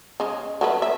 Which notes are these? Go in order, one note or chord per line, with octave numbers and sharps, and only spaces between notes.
C#3 G#3
F#3 A3 B4
E5